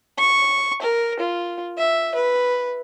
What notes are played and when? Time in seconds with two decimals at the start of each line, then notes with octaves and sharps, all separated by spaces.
0.18 C#6
0.82 A#4
1.20 F4
1.78 E5
2.15 B4